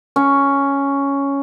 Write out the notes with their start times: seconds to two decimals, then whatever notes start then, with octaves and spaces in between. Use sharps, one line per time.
0.16 C#4